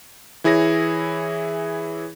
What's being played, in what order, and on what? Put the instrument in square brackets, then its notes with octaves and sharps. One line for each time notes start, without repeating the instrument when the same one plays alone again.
[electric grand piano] E3 E4 G#4 C#5 A#6